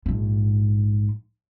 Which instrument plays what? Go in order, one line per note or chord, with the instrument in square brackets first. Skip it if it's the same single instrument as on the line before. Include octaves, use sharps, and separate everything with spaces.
[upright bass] A#1 G#2